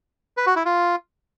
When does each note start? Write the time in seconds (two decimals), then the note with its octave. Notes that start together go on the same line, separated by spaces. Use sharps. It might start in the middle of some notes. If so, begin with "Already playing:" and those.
0.37 B4
0.46 F#4
0.56 E4
0.65 F4